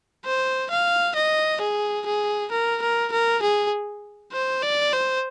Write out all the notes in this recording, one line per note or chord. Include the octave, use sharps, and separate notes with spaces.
C5
F5
D#5
G#4
G#4
A#4
A#4
A#4
G#4
C5
D5
C5